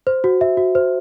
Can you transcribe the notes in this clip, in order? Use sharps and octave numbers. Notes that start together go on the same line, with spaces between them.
C5
F#4
E5
F#4
C5